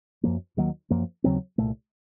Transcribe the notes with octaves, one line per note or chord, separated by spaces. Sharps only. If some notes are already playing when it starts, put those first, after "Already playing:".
F#2 F3 A#3
D#2 D#3 F#3 A#3
F#2 F3 A#3
D#2 C#3 F#3 C4
C2 A#2 A3